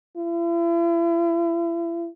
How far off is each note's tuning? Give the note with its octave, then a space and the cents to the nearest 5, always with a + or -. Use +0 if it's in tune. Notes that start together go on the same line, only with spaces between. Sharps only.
E4 +40